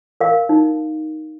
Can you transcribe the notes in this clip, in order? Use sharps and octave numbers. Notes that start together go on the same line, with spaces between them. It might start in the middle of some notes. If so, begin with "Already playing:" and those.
A#4 F5
D#4